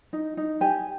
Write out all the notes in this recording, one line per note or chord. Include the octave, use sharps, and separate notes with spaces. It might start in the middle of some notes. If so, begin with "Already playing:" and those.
D#4
D#4
G4 G#5